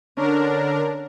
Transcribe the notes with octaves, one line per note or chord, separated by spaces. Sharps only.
D3 C#4 D4 A#4